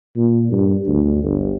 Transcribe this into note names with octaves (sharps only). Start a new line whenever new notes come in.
A#2
G2
D2
G1